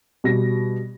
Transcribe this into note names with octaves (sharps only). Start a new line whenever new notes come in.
B2 G3 A#6